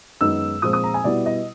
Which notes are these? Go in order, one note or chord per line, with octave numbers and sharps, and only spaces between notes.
F#2 D#3 G#3 B3 D#4 E6
A#2 F3 G#3 C4 F4 D#6
D#6
A#5
G#5
B2 G3 B3 E4 D5
D#5